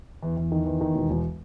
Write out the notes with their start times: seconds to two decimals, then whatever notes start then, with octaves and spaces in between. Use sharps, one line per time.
0.23 E2
0.37 E2
0.52 D#3
0.65 E2
0.81 D#3
0.95 E1
1.10 E1